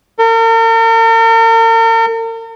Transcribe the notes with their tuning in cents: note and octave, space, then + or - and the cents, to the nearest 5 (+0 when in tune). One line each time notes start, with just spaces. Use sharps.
A#4 -45